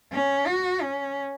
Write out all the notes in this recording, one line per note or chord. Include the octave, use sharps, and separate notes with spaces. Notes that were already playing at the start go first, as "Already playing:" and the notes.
C#4
F#4
C#4